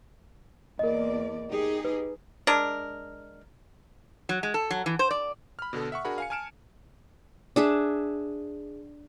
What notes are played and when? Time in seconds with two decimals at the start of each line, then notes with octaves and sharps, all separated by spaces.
0.79 E2 A#3 A#4 D5 D#5
1.51 D#4 G4 G#4
1.85 B4
2.47 G#3 D4 A#4
4.29 F#3
4.43 G#3
4.54 A4
4.71 F#3
4.86 E3
4.99 C5
5.11 D5
5.59 B5 F6
5.73 B2 D3 B3 A4
5.92 E5 F#5 C#6
6.05 D4 F#4 G#4 A#4 F#5 B5
6.18 F5 G#5 C#7
6.30 G#5 A5 F6 D7 E7
7.56 D4 G#4 E5